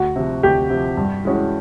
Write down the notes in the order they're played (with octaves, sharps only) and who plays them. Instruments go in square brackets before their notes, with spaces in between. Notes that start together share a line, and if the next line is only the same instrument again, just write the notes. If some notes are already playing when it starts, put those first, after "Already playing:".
Already playing: [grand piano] D2 [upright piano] F#4
[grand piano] C3 F3
[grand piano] D2 [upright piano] G4
[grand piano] C3 F3
G2
E3 G#3 C#4 F#4